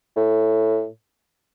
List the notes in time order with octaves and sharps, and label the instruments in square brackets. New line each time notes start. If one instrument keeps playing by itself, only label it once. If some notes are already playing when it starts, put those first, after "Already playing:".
[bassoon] A2